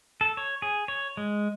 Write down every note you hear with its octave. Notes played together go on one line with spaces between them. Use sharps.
A4
C#5
G#4
C#5
G#3